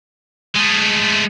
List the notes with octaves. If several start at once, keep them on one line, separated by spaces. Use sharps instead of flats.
G#3 A3